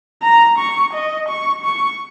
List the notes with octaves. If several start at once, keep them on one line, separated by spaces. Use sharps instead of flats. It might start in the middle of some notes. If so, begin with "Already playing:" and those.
A#5
C#6
D#5
C#6
C#6